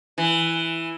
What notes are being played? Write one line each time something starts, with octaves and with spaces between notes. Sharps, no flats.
E3